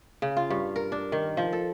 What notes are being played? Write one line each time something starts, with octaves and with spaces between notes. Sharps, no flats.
C#3
F4
G2
A#4
D4
D#3
F3
A4